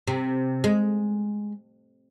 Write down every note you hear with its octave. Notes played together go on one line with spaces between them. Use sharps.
C3
G#3